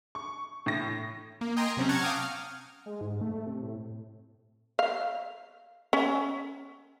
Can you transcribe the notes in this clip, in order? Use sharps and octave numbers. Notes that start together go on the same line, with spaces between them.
C#6
A2 A#6
A#3
D#5 G5 G#5 A#5 C6
C3 F#3 C4 C#4
F#5 A5 A#5 C#6 F6 G#6
F5 G5 G#5 D6 D#6 F6
F6
G#3
G#2
A3
C3
A2
F5
C#4